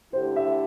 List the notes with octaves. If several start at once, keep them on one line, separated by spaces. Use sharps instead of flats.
D3 A3 E4 G4 C5
E5